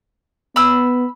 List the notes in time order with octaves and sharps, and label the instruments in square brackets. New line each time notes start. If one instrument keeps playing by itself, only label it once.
[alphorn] B3 [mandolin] B5 E6